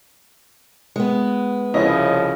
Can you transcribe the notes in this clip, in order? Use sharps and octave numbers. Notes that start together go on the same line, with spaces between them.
G#3 B3
C2 C#3 F3 C#4 E4 D#5